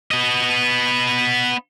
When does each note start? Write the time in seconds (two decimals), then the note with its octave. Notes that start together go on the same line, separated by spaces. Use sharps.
0.11 B3 D#5